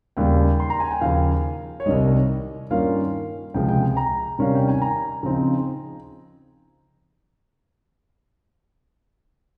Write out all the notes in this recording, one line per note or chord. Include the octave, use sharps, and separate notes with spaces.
D#2 C#3 G3 A#3 G5
C6
A#5
G#5
G5
D#2 C#3 F3 F5
C#5
C2 C3 D#3 G3 D#5
G2 D#3 A#3 C#4 F4 F5
C#2 C3 F3 G#3 C4 G5
G5
G#5
A#5
C3 D#3 G3 C#4 F5
G5
G#5
A#5
C#3 F3 C4 D#4